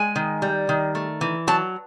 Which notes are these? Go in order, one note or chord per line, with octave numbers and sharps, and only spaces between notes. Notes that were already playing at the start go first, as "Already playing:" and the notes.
Already playing: G#3 G#5
D#3
G3
D#3
A3
E3
F#3 A5